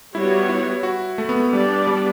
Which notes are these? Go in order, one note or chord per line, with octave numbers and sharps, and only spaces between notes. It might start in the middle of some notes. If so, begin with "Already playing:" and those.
G3 B3 E4 F#4 C#5
E4
F#4
A3
B3
A3
G3 B3 D4 G4 D5
G3